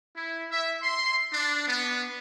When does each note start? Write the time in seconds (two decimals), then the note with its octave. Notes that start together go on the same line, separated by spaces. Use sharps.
0.17 E4
0.51 E5
0.83 C6
1.33 D4
1.68 B3